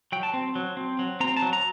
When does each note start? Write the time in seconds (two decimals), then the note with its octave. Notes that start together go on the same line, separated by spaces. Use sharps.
0.12 F#3 G5
0.23 A5
0.34 C4
0.55 F#3
0.77 C4
0.99 F#3
1.20 C4 A#5
1.37 A5
1.42 F#3
1.53 A#5